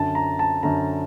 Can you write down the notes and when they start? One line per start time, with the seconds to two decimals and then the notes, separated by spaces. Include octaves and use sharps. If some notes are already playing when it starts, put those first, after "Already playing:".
Already playing: F#2 D3 A5
0.15 A#5
0.39 A5
0.63 F#2 D3 A#5